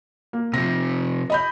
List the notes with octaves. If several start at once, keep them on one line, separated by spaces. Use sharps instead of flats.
A#3
C3 F3 A#6
D#5 B5 G6